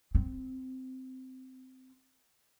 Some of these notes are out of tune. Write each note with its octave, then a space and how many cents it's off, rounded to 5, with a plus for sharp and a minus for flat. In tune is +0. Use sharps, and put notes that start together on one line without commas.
C4 -15